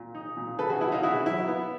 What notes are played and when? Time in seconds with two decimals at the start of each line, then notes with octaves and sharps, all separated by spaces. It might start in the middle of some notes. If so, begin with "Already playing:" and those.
Already playing: A#2
0.15 D#4
0.37 A#2
0.59 C#3 A4 B4
0.69 F#4 G#4
0.81 B3 E4 F#4
0.92 D#4 F4
1.03 C#3 E4 F#4
1.26 F#3 E4
1.48 B3